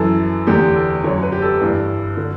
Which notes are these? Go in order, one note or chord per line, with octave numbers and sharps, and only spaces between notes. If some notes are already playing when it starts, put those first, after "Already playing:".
Already playing: F#2 E3 A4
E2 D3 G4
A4
F#2 D3 C#5
B4
G4
A4
G2 E3
D3